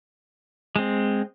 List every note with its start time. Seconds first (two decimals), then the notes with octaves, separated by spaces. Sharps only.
0.76 G#3 C4